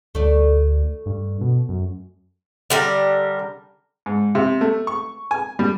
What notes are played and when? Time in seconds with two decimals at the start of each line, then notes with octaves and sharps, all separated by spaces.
0.15 D2 A3 D5
1.06 G2
1.41 B2
1.69 F#2
2.70 D3 G3 A#4
4.06 G#2
4.35 C3
4.61 A3
4.87 C#6
5.31 G#5
5.59 G3